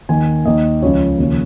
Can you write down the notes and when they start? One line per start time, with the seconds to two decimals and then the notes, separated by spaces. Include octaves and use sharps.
0.09 D#2 D#3 G#5
0.45 D#2 D#3 D#5
0.82 C#2 C#3 F3 C#5
1.18 D#2 C#3 F3